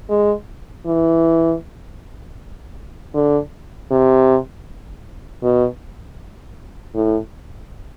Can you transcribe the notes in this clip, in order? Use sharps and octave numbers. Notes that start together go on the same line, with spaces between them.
G#3
E3
D3
C3
B2
A2